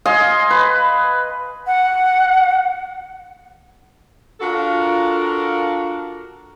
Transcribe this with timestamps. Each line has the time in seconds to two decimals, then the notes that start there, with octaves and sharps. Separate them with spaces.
0.06 D#5 F5 G#5 C6
0.50 B4
1.67 F#5
4.40 D4 F4 F#4 A4 A#4